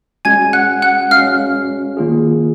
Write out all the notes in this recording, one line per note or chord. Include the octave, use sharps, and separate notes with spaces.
G#3 C#4 F#4 G#5 G#6
F#5 F#6
F#5 F#6
G#3 C#4 F#4 F5 F6
D#3 A#3 F4 G#4